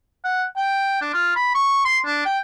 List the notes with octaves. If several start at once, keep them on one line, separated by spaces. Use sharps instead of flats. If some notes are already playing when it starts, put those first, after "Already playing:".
F#5
G5
D4
F4
B5
C#6
C6
D4
G5